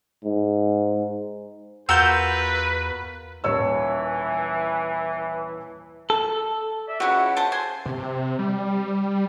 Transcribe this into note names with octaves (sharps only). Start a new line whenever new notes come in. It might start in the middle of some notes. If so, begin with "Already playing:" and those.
G#2
E2 F4 F#4 A#4 B4 E6 G6
D#1 E3 C#5 E6
A4
D5 E5
C#2 E4 F#4 G4 F#5
C5 A5
C5 G#5 C6
C3
G3